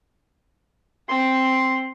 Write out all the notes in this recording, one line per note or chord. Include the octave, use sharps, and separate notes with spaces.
C4 C6